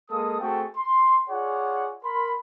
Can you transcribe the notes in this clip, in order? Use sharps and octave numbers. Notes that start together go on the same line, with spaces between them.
G#3 A#3 A4 D#6
A3 C4 F#4 G#4 A4 G5
C6
F4 G#4 C#5 D5 F#5
A#4 B5 C6